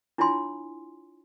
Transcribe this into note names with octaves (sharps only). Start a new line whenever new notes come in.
D4 E4 F4 C#5 G#5 C6